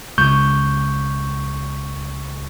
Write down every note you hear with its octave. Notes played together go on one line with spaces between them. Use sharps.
C#2 C#6 G6